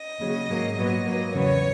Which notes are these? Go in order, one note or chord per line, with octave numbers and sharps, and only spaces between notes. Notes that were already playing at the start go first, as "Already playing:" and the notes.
Already playing: D#5
D#2 C#3 F#3
G#2 F#3 A#3
A#2 F#3 B3 D#5
G#2 F#3 A#3
E2 C#3 F#3 B3 C#5